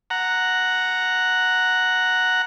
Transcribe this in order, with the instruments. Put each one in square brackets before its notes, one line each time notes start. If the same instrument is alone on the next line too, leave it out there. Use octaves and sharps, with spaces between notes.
[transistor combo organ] F#5 A#5